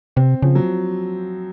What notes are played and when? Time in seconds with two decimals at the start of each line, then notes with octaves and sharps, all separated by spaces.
0.16 C3 C4
0.42 C#3 F3
0.55 F#3